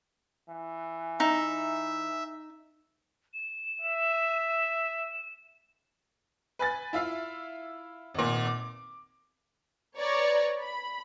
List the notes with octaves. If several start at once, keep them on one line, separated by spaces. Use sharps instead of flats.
E3
D#4 E5
E7
E5
B4 G#5 A6
E4 F4 E5 F5
G#1 A#2
D6
B4 C#5 D5 A#5
B5